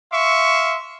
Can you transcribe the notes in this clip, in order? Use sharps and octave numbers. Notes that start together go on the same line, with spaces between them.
E5 F5 C6 C#6